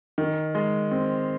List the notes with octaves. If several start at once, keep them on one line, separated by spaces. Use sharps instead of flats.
D#3
G#3
C4